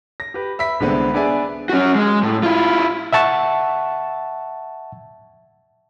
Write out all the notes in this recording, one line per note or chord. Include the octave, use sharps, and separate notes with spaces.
A#6
G4 B4
E5 B5 B6
C2 D3 G#3 B3 C4
B3 D4 G#4 D5 E5 G#5
C#4 F#4
G#3
A2
E4 F4
E5 F#5 A5 C#6